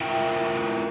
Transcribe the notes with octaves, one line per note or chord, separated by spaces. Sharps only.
E4 F4 A#4 E5 G5